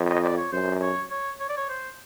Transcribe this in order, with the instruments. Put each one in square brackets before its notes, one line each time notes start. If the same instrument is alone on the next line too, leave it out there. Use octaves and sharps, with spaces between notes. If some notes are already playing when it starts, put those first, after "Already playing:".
Already playing: [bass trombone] F2
[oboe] D#5
D5
C#5
[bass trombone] F#2 [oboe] C5
[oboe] C#5
C#5
C#5
D5
C#5
C5